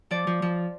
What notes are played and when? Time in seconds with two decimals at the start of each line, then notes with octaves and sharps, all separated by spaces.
0.11 F3 D5
0.27 F3
0.42 F3